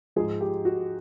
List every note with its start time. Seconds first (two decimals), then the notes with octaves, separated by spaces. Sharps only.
0.16 G#2 F3 G#4
0.41 G4
0.65 F#4